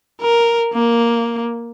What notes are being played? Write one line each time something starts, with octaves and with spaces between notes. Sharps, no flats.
A#4
A#3